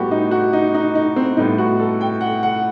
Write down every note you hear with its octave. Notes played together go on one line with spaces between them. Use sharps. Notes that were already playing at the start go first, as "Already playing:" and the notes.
Already playing: A2 G3 B3 F#4 G4
D#4
F#4
D#4
D#4
D#4
C4
A2 G3 B3 D#4
F#4
A4
G5
F#5
F#5